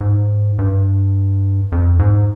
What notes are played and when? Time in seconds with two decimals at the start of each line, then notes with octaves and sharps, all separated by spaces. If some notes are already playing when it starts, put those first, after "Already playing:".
0.01 G#2
0.59 G2
1.72 F2
1.99 G#2